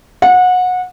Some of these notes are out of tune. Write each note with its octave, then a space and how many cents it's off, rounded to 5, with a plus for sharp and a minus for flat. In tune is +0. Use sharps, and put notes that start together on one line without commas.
F#5 -25